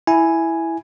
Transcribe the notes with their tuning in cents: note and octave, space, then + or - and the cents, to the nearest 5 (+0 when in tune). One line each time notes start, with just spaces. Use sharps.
E4 +0 G#5 +0